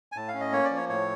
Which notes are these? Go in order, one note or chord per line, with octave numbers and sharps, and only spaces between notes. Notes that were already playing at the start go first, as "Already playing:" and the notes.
G#5
A2 A5
F5
C#4
D#5
A#3 C#5
D5
F3
C#5
A2 C#5